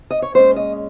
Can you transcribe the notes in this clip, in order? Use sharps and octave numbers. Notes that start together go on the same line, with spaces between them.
D#5
C#5
A#2 G#3 C#4 C5
D#5